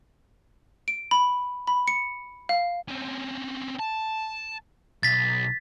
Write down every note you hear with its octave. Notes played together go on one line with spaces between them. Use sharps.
D7
B5
B5
C#7
F5
C4 C#4
A5
B1 A6 B6